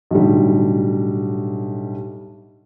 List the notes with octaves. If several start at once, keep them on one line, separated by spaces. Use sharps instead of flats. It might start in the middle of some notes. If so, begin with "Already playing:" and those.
B1 A2 D3 G3